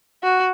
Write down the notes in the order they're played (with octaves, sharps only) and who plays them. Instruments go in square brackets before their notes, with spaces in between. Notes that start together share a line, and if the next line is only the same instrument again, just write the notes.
[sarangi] F#4